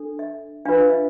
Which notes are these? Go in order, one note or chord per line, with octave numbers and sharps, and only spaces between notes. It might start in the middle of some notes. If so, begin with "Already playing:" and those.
Already playing: D4 A4
E5
D4 F4 B4 F5
F5
E5